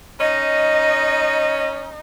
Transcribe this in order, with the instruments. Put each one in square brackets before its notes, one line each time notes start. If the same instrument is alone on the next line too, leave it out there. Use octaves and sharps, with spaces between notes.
[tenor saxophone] C#4 [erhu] D#4 [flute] D#5